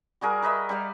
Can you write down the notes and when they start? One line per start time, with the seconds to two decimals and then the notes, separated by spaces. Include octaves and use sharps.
0.21 G3 F#4 G#4 A#4
0.42 A#4 B4 D#5 E5
0.69 G3 G4 B4 F5